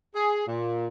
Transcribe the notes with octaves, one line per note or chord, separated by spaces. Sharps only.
G#4
A#2